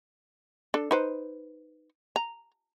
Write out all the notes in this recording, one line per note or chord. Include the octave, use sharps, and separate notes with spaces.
D4 A4
D#4 B4 C5
A#5